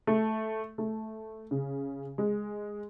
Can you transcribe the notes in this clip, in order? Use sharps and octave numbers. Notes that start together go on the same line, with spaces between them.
A3
A3
C#3
G#3